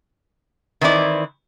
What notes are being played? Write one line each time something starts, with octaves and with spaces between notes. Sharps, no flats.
D#3 E3 C4 E4 D5